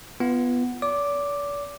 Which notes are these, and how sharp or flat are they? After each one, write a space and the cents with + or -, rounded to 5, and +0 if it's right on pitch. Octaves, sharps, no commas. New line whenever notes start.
B3 +0 F4 -20
D5 -40 D6 +0